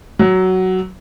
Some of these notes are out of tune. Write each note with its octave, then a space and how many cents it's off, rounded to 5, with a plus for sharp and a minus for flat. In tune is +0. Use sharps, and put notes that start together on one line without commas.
F#3 +10